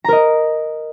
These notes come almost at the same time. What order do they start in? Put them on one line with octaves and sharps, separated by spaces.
A#5 A#4 D#5